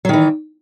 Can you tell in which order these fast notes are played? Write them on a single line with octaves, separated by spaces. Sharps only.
F#3 D#3 E3